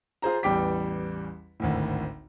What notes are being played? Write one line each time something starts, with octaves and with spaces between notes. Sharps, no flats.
F4 G#4 C5 A#5
A1 E2 G3 G5 D6 B6
G#1 D2 A2